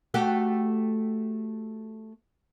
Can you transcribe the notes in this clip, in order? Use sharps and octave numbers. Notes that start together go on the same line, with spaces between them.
A3 F#4 G4